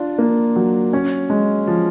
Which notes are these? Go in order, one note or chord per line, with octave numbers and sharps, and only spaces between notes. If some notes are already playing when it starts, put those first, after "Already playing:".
Already playing: D4 F4
A#3
F#3
C#4
G#3
F3